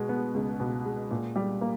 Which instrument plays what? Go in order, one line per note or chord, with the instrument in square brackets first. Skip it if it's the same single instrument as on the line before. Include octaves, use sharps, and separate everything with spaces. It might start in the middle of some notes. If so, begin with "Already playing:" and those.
Already playing: [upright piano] B2 G#3
B3
C#2
B2
G#3
A#2
G3
A#3